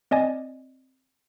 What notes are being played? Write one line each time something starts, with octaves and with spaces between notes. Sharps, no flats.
C4 D5 D#5 G#5